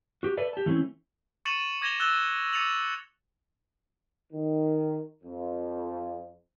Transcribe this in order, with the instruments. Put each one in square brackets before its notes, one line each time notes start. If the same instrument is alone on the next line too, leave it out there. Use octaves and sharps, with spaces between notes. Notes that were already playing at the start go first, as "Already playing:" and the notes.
[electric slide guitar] F#4 G4
A4 B4 D5 E5
G4 A5
E3 A3 C4 C#4 E4
[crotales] C#6 A6 C#7 D#7 E7 F#7
D6 G#6 A#6 E7 F7 G7
E6 F#6 A6 E7 G7
D6 A6 C#7 D#7 F7 F#7
[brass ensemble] D#3
F2